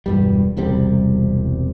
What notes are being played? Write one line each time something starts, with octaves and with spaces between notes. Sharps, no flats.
E1 G2 G3
E1 C2 C3 G3